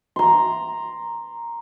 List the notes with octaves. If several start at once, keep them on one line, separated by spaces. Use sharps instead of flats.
A#5 C6